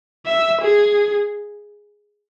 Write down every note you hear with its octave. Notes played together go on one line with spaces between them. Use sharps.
E5
G#4